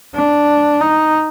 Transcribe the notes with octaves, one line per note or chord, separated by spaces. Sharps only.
D4
D#4